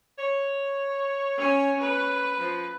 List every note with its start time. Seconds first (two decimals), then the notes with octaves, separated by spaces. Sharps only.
0.19 C#5
1.37 C#4 G#5
1.80 B4
2.39 F3